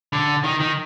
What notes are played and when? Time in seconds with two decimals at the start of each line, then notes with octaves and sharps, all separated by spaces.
0.13 D3
0.44 D#3
0.61 D#3